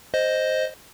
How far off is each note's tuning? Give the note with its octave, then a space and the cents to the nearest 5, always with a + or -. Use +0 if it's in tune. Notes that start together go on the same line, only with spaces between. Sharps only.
C5 +0 D#5 +0